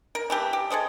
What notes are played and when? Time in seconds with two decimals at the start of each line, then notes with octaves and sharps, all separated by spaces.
0.15 A#4
0.30 E3 A3 G4
0.53 G4
0.70 G#4 A4 C5 D#5